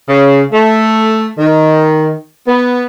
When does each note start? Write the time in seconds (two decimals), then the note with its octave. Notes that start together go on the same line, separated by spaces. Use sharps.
0.08 C#3
0.52 A3
1.38 D#3
2.47 B3